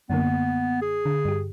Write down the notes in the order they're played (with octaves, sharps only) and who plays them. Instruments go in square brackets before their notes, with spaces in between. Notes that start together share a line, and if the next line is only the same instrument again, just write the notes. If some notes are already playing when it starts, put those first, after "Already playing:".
[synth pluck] F#2 D3 A#3 [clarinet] B3
[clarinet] G#4
[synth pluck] D3
G2 G4